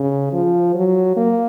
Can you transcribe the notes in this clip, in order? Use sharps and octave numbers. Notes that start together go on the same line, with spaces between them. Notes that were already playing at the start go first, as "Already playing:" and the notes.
Already playing: C#3
F3
F#3
A#3